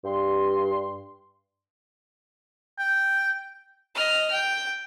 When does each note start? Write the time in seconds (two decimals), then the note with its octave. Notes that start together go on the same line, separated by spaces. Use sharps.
0.04 G2 C6
2.78 G5
3.95 D#5 F6
4.31 G5